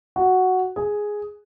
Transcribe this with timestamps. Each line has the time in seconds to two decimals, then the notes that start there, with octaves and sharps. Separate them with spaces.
0.16 F#4
0.76 G#4